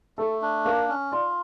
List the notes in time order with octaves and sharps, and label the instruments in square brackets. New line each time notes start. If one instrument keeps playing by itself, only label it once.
[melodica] A3 [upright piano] A4
[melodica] D4
[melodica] A#3 [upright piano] A#4
[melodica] C#4
[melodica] F4 [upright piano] D5